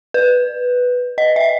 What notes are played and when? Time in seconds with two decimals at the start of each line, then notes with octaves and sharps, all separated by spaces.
0.14 B4
1.18 D#5
1.36 E5